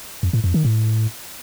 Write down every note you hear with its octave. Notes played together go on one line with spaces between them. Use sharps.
F2
A2
F2
D#3
A2